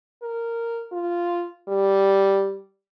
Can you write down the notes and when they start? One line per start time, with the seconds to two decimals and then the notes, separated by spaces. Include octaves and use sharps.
0.23 A#4
0.92 F4
1.69 G3